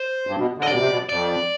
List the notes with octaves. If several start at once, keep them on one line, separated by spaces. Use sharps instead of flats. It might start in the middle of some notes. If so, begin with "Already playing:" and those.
Already playing: C5
G2
B2
D3
D#5
C3 D5
B2
C3
B2
F2 D5